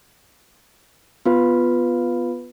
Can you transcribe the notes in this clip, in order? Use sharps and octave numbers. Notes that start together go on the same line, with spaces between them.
B3 F4 B4